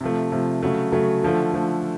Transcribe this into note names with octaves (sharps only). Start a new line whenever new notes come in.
C3 F3 A3
C3 F3 A3
C#3 F#3 A3
C#3 F#3 A3
D3 F3 A3
D3 F3 A3